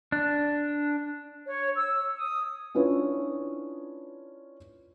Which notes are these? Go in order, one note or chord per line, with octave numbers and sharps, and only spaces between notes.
D4
C#5
E6
D#6
C#4 D4 E4 F4 B4 C#5